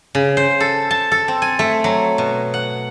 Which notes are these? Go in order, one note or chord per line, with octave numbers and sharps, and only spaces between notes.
C#3
C5
A4
A5
A4
C4
G#5
A3
F#3
B2
F#5